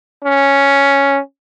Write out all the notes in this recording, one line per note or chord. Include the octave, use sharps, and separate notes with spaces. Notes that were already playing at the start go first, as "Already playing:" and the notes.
C#4